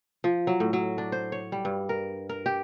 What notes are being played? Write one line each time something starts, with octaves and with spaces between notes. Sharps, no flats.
F3
F#3
A2
F#3
D4
C5
C#5
G3
G2
A#4
A#4
G4